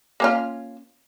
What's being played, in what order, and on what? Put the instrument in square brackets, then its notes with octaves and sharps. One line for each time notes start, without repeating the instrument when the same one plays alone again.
[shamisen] A#3 C#4 F4